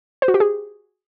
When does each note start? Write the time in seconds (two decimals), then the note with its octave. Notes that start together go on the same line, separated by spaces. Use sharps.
0.22 C5
0.28 F#4
0.34 G4
0.40 G#4